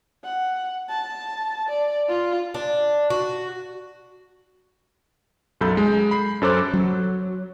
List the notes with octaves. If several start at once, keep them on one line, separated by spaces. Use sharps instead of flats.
F#5
A5
D5
F4
D4
F#4
B1 F#2 A4 B5 G6
G#3
B5 C7
F#2 C#4 A4 C5 D6 F#6
F#3